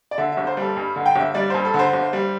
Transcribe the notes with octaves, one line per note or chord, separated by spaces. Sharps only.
D5
D3 E5
E5
G1
C5
G3 A4
G2
D3
G5
G1 E5
G3 D5
G2 C5
A4
D3
C5
G1
G3